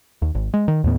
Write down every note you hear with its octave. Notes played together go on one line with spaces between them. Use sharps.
D#2
G#1
G#3
D#3
D#2 A2 B3